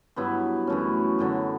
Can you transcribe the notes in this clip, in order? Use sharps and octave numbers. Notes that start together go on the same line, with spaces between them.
G2 F#3 B3 E4
F#2 E3 A3 C#4
F#2 D3 F#3